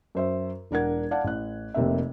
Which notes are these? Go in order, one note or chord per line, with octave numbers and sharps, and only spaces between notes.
F#2 C5 E5
E1 D4 A#4 F#5 G#6
D5 F5 F#5 A5
A1 F#6
F1 C3 A#3 E5